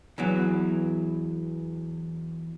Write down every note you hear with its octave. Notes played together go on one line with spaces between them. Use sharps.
E2 E3 F#3